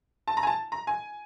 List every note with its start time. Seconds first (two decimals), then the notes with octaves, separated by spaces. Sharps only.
0.28 A5
0.37 A#5
0.43 G#5
0.47 A5
0.72 A#5
0.87 G#5